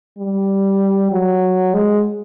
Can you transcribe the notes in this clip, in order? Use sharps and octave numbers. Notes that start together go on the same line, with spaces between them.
G3
F#3
G#3